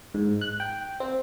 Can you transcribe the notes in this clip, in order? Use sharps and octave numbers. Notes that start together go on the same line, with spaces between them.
G#2
F#6
G5
C4